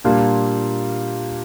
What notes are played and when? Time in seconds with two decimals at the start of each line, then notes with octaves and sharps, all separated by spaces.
0.04 A#2 G3 A#3 D4 F4